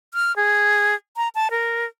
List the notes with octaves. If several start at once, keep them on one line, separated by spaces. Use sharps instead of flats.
F6
G#4
A#5
A5
A#4